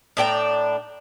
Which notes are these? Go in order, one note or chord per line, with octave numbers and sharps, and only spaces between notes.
A2 D4 G5 A#5